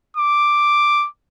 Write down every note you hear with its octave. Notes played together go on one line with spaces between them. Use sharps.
D6